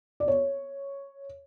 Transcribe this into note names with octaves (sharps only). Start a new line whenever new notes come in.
D5
C#5